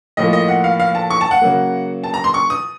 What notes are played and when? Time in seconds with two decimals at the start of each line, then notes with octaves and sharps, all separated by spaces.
0.17 A2 F3 A#3 D#5
0.33 D#5
0.48 F#5
0.64 F5
0.80 F5
0.95 A5
1.10 C#6
1.21 A5
1.31 F#5
1.42 C#3 F#3 A#3
2.04 A5
2.14 A#5
2.24 C6
2.34 C#6
2.50 D#6